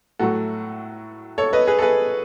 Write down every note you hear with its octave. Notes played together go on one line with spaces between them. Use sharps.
A2 F#3 A3 F#4 A4
A4 C#5
B4 D#5
G#4 B4
A4
G#4 B4